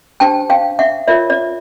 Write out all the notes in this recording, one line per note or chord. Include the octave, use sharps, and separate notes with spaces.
D4 G4 C5 G5 A5
F5 G5
E5 F#5
F4 A#4 C#5 D5 E5
D5